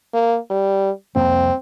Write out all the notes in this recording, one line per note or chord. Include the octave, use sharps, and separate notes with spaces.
A#3
G3
C2 F2 A#3 C4